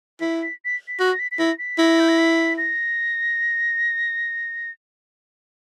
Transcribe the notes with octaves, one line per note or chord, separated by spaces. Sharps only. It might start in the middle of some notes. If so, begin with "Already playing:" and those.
E4 B6
B6
B6
B6
F#4 A#6
A#6
B6
B6
E4 A#6
B6
E4 A#6
G6
A#6
B6
A#6